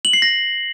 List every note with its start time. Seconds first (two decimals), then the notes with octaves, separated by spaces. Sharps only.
0.05 F#7
0.13 C7
0.22 A#6